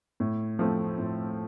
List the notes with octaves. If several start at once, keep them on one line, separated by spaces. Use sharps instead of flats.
A2
F3 A3 C4
A2